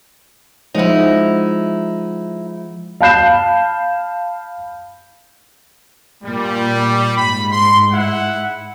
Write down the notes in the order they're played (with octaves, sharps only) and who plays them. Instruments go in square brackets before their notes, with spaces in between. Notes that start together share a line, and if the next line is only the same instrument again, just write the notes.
[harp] F3 G#3 F#5 [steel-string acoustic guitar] D#4 E4
[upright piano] F5 A5 B5 G6 C7 E7
[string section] A#2 [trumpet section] G3
[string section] G#2 [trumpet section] B5
[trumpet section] C6
E4 F#5